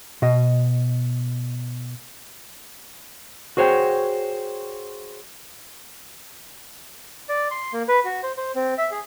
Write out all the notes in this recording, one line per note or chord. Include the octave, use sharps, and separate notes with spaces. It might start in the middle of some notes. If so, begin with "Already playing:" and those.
B2 D#5
F#4 G#4 C5 C#5 F#5 G5
D5
C6
A#3
B4
F#4
C5
C5
C4
E5
G#4